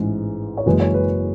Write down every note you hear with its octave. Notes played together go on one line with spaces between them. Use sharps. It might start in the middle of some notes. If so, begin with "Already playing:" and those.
Already playing: A1 G#2 E3 G#3
C#5
F#1 F#2 E3 G#3 B4
C#5
B4